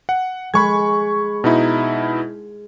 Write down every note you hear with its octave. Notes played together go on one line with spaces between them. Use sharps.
F#5
G#3 B5 C#6 G#6
B2 D#4 E4